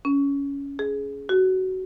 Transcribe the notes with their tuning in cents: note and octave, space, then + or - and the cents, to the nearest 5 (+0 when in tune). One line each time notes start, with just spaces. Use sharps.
C#4 +15
G#4 +10
F#4 +15